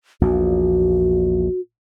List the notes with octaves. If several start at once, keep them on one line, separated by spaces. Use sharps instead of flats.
A#1 E2 A#2 F#4